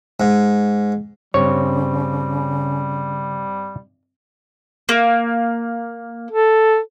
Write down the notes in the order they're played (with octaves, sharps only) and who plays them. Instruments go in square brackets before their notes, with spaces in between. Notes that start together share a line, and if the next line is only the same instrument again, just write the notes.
[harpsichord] G#2
[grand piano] G2 C4 [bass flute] C#3 [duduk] G3 [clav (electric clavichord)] C#5
[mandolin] A#3
[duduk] A4